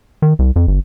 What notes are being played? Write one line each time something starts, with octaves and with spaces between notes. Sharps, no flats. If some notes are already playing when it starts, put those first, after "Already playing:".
D#3
C2
F2
G1